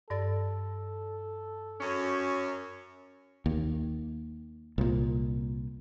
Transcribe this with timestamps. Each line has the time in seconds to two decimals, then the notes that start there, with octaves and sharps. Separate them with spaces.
0.10 G2 A4 D5 A6
1.80 F#2 C#4
3.46 D#2
4.78 C2 A#2